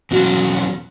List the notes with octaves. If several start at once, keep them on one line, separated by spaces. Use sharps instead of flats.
E2 B2 F#3 C#4 F#4